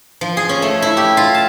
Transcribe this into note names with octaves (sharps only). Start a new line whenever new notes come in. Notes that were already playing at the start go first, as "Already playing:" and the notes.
F3
G#4
C#4
A3
E4
G4
F4
A5